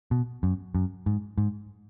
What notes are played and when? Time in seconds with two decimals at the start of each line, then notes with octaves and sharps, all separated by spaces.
0.11 B2
0.43 F#2
0.75 F#2
1.06 G#2
1.38 G#2